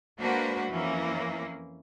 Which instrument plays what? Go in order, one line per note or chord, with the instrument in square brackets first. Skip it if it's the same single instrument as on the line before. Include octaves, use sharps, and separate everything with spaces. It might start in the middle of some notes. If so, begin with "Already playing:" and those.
[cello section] G#3 A#3 D4 F#4 B4 C5
F2 E3 A#3 C#4